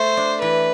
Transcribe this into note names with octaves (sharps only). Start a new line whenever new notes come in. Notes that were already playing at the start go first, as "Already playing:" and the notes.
Already playing: A3 C5
D4
E3 B4